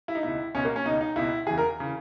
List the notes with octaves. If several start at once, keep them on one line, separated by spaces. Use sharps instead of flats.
E4
D#4
C#2 B2 E4
C#2 B2 C#4
A#3
C#4
C#2 B2 D#4
D#4
C#2 B2 E4
E2 C#3 E3 G#4
A#4
C#3 E3